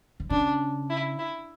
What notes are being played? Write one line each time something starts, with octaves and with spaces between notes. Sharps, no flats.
D3
C#3 D4
E4
E4